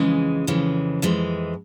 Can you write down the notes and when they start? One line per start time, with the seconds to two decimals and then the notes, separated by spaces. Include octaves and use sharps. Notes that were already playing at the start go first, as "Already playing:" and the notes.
Already playing: F2 C#3 E3 G#3
0.47 F2 C#3 E3 G#3
1.02 F2 E3 G#3